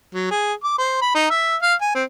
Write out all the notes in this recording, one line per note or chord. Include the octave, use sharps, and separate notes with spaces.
F#3
G#4
D6
C5
B5
D#4
E5
F5
G#5
C4